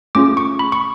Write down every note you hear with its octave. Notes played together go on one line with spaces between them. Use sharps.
A3 C#4 F4 G#4 D6
C#6
B5
C#6